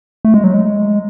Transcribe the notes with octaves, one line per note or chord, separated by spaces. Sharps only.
A3
G#3
F#3
G#3